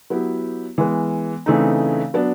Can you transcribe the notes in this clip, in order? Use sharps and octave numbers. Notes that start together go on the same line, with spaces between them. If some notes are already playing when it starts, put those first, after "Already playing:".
F#3 B3 E4 G4
E3 G#3 B3
C#3 E3 A3 C4 D#4
F#3 B3 D4